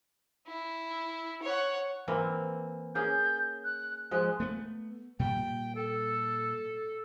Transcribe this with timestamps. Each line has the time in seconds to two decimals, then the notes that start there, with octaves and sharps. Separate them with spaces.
0.48 E4
1.43 C#5 F#5
2.08 E3 A#3 C4
2.95 A#3 C#4 G#4 G6
3.64 F#6
4.11 F3 G#3 F#6
4.40 A3 B3
5.19 A#2 G3 G5
5.75 A4